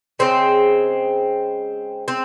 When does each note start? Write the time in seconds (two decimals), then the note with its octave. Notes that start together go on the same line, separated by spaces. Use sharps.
0.19 C#3 F3 G#3 C4
2.08 C4